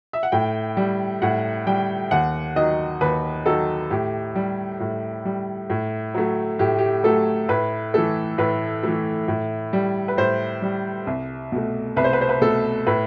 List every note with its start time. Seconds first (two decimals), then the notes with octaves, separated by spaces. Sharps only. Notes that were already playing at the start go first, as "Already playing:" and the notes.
0.13 E5
0.23 F#5
0.32 A2 G5
0.77 G3
1.22 A2 F#5
1.67 G3 G5
2.11 D#2 F#5
2.56 D#3 F#3 D#5
3.01 D#2 B4
3.46 D#3 F#3 A4
3.90 A2 G4
4.35 G3
4.80 A2
5.25 G3
5.70 A2
6.14 F#3 A3
6.59 A2 G4
6.78 G4
7.04 F#3 A3 A4
7.49 A2 B4
7.94 E3 A3 A4
8.38 A2 B4
8.83 E3 A3
9.28 A2
9.73 G3
10.08 B4
10.18 A2 C5
10.62 G3
11.07 C2
11.52 B2 A3
11.96 C2 B4
12.04 C5
12.13 B4
12.21 C5
12.29 B4
12.41 B2 A3 A4
12.87 A2 B4